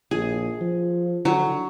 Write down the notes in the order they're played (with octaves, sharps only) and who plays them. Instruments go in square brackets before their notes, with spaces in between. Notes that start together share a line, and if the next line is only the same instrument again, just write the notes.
[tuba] A#1 [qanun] G#4
[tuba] F3
[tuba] D3 [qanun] F#3